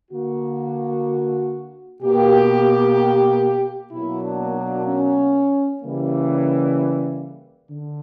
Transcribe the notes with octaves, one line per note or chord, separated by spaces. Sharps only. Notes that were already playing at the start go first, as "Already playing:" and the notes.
D3 A#3 F#4
B2 A#3 G4
B2 F#3 A#3 E4
D4
D4
C#4
C#3 E3 G3 A#3
D3